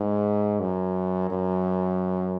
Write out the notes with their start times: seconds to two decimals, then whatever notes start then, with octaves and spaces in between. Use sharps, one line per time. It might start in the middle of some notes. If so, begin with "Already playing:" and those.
Already playing: G#2
0.60 F#2
1.30 F#2